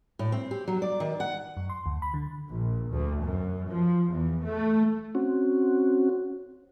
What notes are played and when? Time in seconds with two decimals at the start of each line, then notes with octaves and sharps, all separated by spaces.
0.19 A2
0.32 C4
0.51 G4
0.68 F#3
0.82 D5
1.00 D#3
1.20 F#5
1.57 F#2
1.70 C6
1.86 D2
2.02 B5
2.14 D3
2.47 A#1
2.90 D2
3.23 F#2
3.69 F3
4.10 E2
4.44 A3
5.15 C4 C#4 F#4